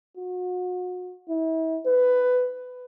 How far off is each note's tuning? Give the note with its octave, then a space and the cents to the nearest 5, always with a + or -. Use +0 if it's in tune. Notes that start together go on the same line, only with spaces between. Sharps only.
F#4 -35
E4 -35
B4 +15